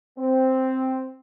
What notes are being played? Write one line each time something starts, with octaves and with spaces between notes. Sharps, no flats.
C4